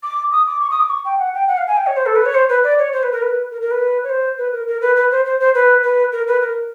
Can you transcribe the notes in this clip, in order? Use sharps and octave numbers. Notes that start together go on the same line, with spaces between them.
D6
D#6
D6
C#6
D#6
D6
C#6
G5
F#5
G5
F#5
F5
G#5
G5
C#5
C5
A4
B4
C#5
C5
B4
D5
C#5
C5
B4
A#4
B4
A#4
A#4
B4
C#5
C5
B4
A#4
A#4
B4
B4
C5
C5
C5
B4
B4
A#4
B4
A#4